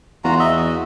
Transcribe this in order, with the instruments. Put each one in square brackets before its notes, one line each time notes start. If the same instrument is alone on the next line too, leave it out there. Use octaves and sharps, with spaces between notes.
[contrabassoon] E2 [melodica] F4 F#4 A#5
[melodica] D#5 E5
F#4